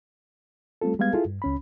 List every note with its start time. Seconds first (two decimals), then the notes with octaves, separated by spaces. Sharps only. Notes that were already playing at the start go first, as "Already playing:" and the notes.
0.82 G3 A3 C4 F4 A4
0.99 G3 G#3 B3 F5 G#6
1.13 E4 F4 G#4 A4
1.26 G2
1.42 C#2 C#4 B5